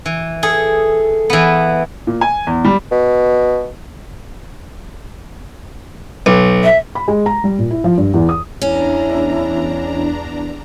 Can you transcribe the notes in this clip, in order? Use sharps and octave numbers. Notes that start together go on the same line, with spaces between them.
E3
G#4 A4
E3 B3
A#2
G#5
E2
G3
B2
B1
E5
B5
G#3
A#5
G3
A#2
E4
F3
G2
E2
D#6
E2 C#4 D4 E4 A#5